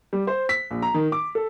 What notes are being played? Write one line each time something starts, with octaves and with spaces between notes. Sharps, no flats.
G3
C5
B6
A#1
A#5
D#3
D6
A4